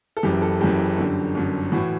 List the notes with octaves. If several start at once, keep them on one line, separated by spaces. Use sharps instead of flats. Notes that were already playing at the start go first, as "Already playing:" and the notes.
A4
F#1 F#2 E3 G4
A4
F#1 F#2 E3 G4
G1 F#2 D3
G1 F#2 D3
A2 E3 F#4